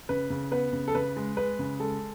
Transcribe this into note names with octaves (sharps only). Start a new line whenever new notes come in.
C#3 B4
C#3
B3 B4
C#3
A4
C#3 B4
G#3
G#3 B4
C#3
G#3 A4